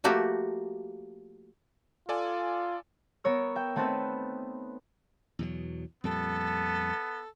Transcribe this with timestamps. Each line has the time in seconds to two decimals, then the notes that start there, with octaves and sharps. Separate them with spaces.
0.04 F3 A3 A#3 F#4 G4
2.09 F4 A4 D5 G#5
3.24 B3 A#4 C#5 E6
3.56 E5 G5
3.76 A3 B3 C4 D#4 A4 B4
5.39 E2 B2 F#3
6.04 F2 A#2 G3 B3 A4